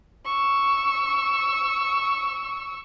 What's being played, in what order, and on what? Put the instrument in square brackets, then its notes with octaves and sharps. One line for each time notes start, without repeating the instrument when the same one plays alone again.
[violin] C#6 E6